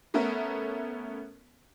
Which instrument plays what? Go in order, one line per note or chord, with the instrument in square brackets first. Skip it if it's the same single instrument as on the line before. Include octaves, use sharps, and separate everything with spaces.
[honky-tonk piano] A3 B3 C#4 A#4 E5